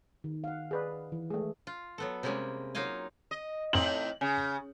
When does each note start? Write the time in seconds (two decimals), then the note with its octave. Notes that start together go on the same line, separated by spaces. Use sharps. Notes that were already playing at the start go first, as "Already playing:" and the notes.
0.24 D#3
0.44 F5 F#5
0.71 G#4 B4 D5
1.12 E3
1.30 G#3 A3 G#4
1.67 F4
1.98 F#3 B3 A4
2.23 C3 G3 G#3 A#3 C#4
2.75 F#3 A#3 D#4 F4 F5 G#5
3.31 D#5
3.73 A2 C4 D#4 F#7
4.21 C#3